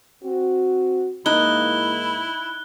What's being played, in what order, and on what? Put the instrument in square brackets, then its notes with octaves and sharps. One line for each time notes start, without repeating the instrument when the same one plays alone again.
[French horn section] C4 F#4
[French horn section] G#2 E3 A#3 [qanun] D#4 [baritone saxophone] E4 [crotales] F#6 G7